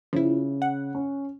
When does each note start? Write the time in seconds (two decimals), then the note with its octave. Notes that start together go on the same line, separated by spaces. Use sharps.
0.13 C#3 F3 E4
0.62 F#5
0.95 C#4